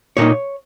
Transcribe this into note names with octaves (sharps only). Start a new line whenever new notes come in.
A#2 A#3 D#4 C#5